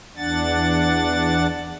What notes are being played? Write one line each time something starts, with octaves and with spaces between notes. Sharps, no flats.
E2 D4 F#5 A6